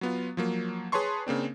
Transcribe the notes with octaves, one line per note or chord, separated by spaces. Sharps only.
F#3 B3 F4
F3 F#3 A#3
G#4 B4 C#5 A5 C6 C#6
C#3 A#3 C4 D4